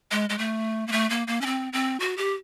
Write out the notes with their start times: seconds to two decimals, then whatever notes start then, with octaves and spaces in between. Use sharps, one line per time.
0.11 G#3
0.29 G#3
0.38 A3
0.87 A#3
0.92 A3
1.10 A#3
1.27 A#3
1.41 C#4
1.46 C4
1.73 C4
2.00 F#4
2.17 G4